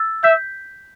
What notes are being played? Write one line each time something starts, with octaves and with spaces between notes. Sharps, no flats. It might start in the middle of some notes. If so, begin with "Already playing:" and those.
Already playing: E6 A6
E5 G6 B6